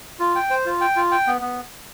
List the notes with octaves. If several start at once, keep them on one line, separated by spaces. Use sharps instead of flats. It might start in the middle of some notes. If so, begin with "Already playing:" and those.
F4
G5
C5
F4
G5
F4
G5
B3
B3